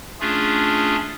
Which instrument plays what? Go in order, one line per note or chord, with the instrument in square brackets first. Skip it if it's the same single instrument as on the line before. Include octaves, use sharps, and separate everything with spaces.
[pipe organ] A3 C#4 D4 F4 G#4